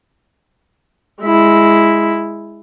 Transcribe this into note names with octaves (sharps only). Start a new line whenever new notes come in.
G#3 E4